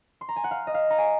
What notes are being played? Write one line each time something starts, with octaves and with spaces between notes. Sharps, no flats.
C6
A#5
G#5
F#5
F5
D#5
F5
A#5
G#5